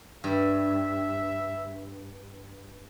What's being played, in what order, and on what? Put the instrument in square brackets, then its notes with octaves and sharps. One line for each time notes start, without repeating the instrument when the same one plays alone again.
[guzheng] G2 [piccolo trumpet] E5